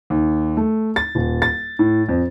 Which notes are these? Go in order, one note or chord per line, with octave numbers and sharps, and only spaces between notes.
D#2
A3
A6
D#1
A6
A2
F2